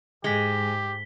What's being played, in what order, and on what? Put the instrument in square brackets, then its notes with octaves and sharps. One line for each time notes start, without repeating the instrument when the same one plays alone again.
[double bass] G#2 [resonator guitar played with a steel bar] G#3 [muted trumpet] G4 [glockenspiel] B6 G7